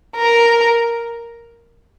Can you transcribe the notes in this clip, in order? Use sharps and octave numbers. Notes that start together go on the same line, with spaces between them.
A#4